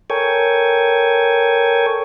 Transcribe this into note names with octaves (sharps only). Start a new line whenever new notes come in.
A4 A#4 C#5 G5 G#5 C#6